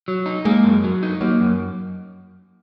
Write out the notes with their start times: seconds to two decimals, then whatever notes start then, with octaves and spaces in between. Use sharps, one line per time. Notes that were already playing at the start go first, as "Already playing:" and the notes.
0.08 F#3
0.26 D#4
0.45 G#3 A#3
0.64 F#2
0.84 F#3
1.03 D#4
1.21 F#3 A#3
1.40 F#2